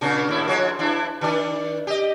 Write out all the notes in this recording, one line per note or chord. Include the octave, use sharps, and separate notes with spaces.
A#2 C#3 D4
D#2 A2 E4
F3 G#3 C#5
E3 D4 E4
D#3 D4 D5
G4 D#5